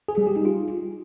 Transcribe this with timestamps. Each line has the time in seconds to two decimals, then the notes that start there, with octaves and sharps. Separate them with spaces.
0.08 G#4
0.18 G3
0.27 G4
0.36 D#4
0.45 F4